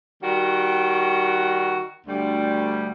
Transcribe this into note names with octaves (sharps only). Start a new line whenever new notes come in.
D#3 G3 F#4
D2 G3